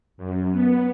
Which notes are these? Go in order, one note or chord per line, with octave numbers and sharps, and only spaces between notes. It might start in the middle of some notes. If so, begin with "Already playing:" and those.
F#2
B3